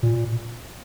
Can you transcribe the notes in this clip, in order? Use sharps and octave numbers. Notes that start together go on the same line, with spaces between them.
A#2